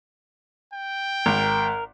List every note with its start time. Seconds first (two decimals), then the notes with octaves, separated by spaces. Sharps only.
0.74 G5
1.26 G#1 A#4